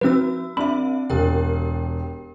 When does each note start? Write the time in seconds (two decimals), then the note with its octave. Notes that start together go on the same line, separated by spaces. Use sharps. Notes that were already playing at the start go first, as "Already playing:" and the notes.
0.01 F3 C4 F#4 B4 E6
0.57 C4 D4 E5 B5
1.10 E1 G4 A#4 G5